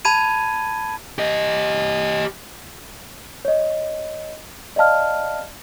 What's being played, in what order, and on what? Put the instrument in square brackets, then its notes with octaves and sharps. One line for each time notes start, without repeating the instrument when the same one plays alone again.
[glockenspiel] A5 B5 G#6 D#7
[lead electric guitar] G4 D#5
[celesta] C#5 D#5
D5 D#5 F5 A5 F6